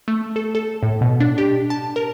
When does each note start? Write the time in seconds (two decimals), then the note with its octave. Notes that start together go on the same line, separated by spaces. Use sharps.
0.08 A3
0.36 A4
0.55 A4
0.83 A2
1.01 B2
1.20 D4
1.38 G4
1.70 A5
1.96 A#4